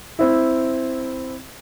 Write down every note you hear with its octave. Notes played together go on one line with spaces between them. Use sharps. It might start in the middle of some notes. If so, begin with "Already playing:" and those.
C4 E4